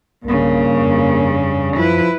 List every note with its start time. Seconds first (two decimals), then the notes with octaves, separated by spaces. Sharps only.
0.24 B1 G2 C#3 A#3
0.81 F2
1.77 F#2 F3 E4 B4